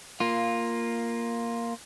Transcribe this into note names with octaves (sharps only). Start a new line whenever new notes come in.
A#3 F4